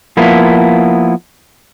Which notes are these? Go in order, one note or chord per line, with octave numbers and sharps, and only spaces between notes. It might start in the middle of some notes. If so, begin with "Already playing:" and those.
F3 A#3 B3 E4